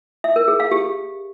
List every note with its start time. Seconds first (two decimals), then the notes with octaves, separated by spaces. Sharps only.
0.24 E5
0.36 A#4
0.48 G#4
0.60 F5
0.72 G4